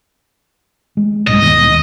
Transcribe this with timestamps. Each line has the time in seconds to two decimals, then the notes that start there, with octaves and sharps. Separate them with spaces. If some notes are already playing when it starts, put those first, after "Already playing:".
0.97 G#3
1.27 A#1 G2 G3 D#5
1.40 E1 D#2 B3